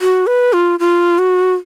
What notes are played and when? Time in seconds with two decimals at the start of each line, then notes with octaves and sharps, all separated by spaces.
0.01 F#4
0.27 B4
0.53 F4
0.80 F4
1.18 F#4